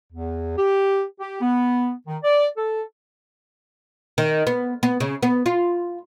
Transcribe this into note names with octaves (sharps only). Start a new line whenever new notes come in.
E2
G4
G4
B3
D#3
D5
A4
D#3
B3
B3
C#3
B3
F4